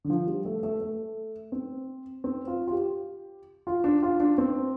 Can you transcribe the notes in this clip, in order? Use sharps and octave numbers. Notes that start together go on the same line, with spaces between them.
D3
F3
G3
A3
A3
A3
C4
C4
F4
F4
G4
F4
D4
F4
D4
C4